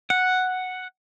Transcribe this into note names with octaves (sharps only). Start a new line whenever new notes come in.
F#5